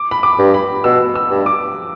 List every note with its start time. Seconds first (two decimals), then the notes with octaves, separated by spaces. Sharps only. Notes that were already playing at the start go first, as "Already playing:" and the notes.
Already playing: D6
0.11 B5
0.23 D6
0.39 G2
0.54 B5
0.84 B2 E6
1.15 E6
1.30 G2
1.46 D6